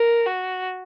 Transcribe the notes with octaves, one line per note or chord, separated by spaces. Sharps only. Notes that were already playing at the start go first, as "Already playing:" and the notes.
Already playing: A#4
F#4